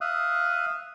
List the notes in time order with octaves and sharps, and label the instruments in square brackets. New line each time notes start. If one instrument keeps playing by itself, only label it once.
[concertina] E5 F5 D#6 F#6